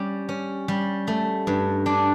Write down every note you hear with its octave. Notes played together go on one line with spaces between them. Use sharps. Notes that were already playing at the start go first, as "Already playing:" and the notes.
Already playing: G3 C#4
C#4
G3
A3
G2
D4